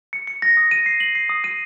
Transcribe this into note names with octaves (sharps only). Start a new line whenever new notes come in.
C#7
C#7
A#6
D#6
D#7
C7
F#7
C7
D#6
D#7